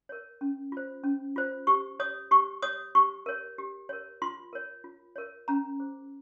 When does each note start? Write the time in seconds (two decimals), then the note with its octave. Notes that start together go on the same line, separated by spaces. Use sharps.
0.09 A#4 C#5
0.41 C#4
0.72 F4 C5
1.04 C#4
1.36 F4 C5
1.67 G4 C#6
2.00 C#5 D#6
2.31 G4 C#6
2.62 C#5 D#6
2.95 G4 C#6
3.26 A#4 C#5
3.58 G4
3.89 A#4 C#5
4.22 F4 C6
4.53 A#4 C#5
4.84 F4
5.16 A#4 C#5
5.48 C#4 A#5
5.80 G#4 C5